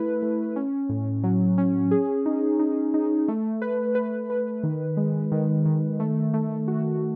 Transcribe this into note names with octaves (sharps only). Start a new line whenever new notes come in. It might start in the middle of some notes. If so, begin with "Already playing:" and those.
Already playing: A3 E4 B4
A3
C#4
A2
F#3
C#4
G#4
D#4
D#4
D#4
A3
B4
B4
B4
D#3
G#3
D#3
D#3
A3
A3
F#4